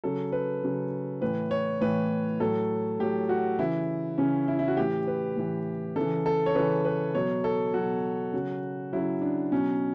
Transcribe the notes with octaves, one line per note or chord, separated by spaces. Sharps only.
C#3 F#3 A4
B4
C#3 F#3
A2 E3 B4
C#5
A2 E3 B4
A2 F#3 A4
A2 F#3 G4
F#4
C#3 E3 E4
C#3 E3 C#4
E4
E4
F#4
A2 E3 G4
B4
A2 E3
C#3 E3 A4
A4
C#5
C#3 E3 B4
B4
B2 F#3 C#5
A4
B2 F#3 F#4
C#3 F#3
C#3 F#3 E4
D4
B2 F#3 C#4